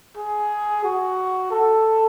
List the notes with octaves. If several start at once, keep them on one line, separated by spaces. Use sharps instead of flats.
G#4
F#4
A4